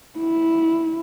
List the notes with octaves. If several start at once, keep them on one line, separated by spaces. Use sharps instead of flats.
E4